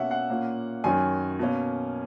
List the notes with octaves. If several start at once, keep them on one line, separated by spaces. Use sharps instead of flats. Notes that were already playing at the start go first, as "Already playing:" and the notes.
Already playing: B2 A#3 C#4 E5 F#5
F#5
A#2 A#3 C#4
F#2 D#3 F#3 C#4 G#5
B2 A#3 C#4